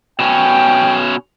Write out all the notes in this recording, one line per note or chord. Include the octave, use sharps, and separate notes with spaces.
B2 C#4 G5